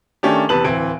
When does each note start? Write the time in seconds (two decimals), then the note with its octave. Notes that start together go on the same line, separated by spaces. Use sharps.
0.23 D#3 A3 C#4 D4 G4
0.49 E2 C3 B4 A5 F#7
0.64 D1 E3 C4 D7